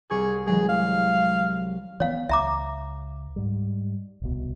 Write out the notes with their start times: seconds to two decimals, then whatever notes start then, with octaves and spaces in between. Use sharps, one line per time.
0.10 C2 G#4 C#6 G#6
0.47 E3 F#3 G#3 G#4
0.68 F5
2.00 E3 B3 C#5 F5
2.29 C#2 E5 A#5 D6
3.36 G#2 G3
4.22 D1 C2 B2